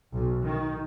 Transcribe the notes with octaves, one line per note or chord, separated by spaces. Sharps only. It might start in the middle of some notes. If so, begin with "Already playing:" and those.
B1
D#3